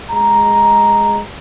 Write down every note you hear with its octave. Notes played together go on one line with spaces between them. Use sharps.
G#3 A#5